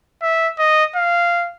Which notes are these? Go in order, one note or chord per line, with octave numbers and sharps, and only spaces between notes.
E5
D#5
F5